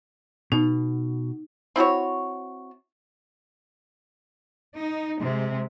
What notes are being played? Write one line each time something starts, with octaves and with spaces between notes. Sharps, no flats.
B2 D#4
C4 E4 F#4 C#5
D#4
C3 G#3